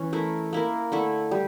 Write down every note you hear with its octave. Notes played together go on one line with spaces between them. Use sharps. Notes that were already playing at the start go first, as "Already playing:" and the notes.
Already playing: E3 C#4
A3 E4 A#4
A#3 E4 A#4
D3 A3 E4
G3